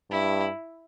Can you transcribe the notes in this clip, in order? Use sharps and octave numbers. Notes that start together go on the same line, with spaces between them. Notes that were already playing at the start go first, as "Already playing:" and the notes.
G2 E4